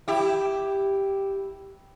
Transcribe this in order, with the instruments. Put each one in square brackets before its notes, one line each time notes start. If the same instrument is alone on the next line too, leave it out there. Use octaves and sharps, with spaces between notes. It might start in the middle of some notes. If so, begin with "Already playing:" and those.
[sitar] E4 G4